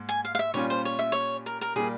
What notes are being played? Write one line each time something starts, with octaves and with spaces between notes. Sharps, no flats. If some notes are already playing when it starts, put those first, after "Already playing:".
Already playing: G#2 A#3
G#5
F5
F5
E5
A#2 G3 C#4 F4 C#5
C5
C#5
E5
C#5
A#4
A#4
A#2 G3 A#3 G#4